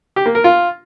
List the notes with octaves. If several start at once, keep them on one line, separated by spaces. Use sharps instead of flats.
G4
A#3
A#4
F4